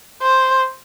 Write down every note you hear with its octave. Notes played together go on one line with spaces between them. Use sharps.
C5